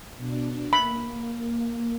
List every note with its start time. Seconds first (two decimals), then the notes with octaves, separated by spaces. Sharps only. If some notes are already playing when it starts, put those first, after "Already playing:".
0.17 B2 D4
0.73 A#3 B5